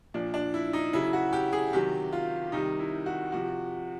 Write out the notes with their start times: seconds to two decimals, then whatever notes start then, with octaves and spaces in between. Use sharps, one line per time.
0.14 A#2 F3 D4
0.34 D4
0.54 E4
0.73 D#4
0.93 C#3 F#3 E4
1.13 F#4
1.33 G4
1.53 G#4
1.73 C3 D#3 F#3 G4
2.13 F4
2.52 C3 D#3 G3 D#4
2.79 E4
3.06 F#4
3.32 C3 F3 F#4